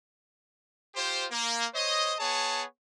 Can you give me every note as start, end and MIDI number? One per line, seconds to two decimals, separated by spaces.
0.95 1.26 65
0.95 1.26 67
0.95 1.26 72
1.31 1.64 58
1.74 2.13 72
1.74 2.13 73
1.74 2.13 75
2.19 2.63 59
2.19 2.63 68
2.19 2.63 73
2.19 2.63 81